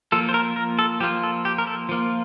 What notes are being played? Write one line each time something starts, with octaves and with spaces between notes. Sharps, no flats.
F3 A#3 F4 A4
C5
A#4
A#4
A4
F3 A#3 F4 G4
A4
G4
A#4
A4
F3 A#3 F4